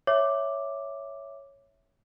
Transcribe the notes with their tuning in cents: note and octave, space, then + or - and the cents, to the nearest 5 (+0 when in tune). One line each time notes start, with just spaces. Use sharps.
C#5 +0 E5 +0 D6 +0